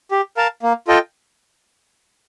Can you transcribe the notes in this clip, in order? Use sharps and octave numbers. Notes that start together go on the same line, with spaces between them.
G4
A#4 F5 A5
A#3
F4 A4 D#5 G5